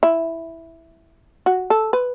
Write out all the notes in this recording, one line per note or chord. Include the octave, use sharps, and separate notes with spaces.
E4
F#4
A4
B4